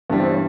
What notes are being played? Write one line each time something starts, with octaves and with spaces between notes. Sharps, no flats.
G2 E3 G3 B3
C4
C#4